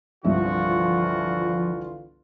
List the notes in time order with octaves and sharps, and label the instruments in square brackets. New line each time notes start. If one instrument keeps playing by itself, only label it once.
[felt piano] G1 C2 E5 [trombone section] D3 E3 F4 [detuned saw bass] F3 [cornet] F#4